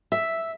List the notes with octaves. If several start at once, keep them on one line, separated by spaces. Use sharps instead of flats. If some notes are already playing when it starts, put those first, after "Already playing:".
E5